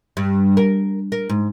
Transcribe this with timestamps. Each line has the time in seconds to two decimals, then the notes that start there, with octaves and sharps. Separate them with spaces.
0.17 G2
0.57 A#4
1.12 A#4
1.29 G#2